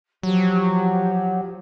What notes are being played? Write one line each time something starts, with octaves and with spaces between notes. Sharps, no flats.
F3 F#3 G4